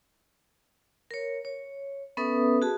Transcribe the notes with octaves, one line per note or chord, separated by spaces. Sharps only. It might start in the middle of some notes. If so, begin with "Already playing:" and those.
A#4 C#5
C#5
B3 C#4 A4 B4 E5 D#6
F#4 G#4 A5